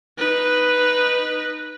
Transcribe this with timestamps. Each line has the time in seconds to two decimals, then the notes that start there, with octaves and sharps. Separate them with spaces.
0.18 D#4 B4